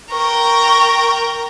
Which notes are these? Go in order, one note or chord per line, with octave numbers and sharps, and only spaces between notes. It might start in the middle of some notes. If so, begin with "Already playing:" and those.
A#4 G5 C#6